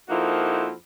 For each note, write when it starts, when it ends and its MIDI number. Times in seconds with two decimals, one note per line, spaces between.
0.09 0.73 41
0.09 0.73 53
0.09 0.73 58
0.09 0.73 63
0.09 0.73 64
0.09 0.73 66